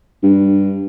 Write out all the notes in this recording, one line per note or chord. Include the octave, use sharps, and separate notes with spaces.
G2